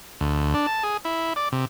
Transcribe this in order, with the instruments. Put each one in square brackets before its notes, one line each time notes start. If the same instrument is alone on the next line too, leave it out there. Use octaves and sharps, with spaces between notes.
[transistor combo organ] D2
D4
A5
G#4
E4
D5
C3